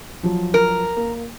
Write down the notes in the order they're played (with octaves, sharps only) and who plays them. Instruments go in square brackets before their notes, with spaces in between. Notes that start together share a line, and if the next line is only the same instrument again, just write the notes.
[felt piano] F3 F#3
[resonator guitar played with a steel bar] A#4
[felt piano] A#3